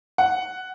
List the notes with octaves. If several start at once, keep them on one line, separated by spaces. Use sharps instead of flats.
F#5